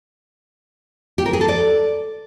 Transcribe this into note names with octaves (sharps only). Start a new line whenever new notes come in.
G4
A#4
G#4
A4
D5